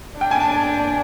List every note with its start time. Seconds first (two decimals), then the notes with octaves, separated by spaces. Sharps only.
0.20 D4 G5
0.31 G#5
0.40 A5